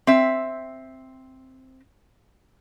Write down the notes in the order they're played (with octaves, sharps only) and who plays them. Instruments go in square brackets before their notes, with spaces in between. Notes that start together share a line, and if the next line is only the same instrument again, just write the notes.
[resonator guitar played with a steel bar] C4 E5